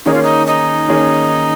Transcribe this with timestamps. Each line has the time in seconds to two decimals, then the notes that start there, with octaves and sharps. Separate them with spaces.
0.05 D#3 A#3 C#4 D#4 G#4 C#5
0.14 F4
0.23 D#4
0.47 D#4
0.88 D#3 A#3 C#4 G#4 C#5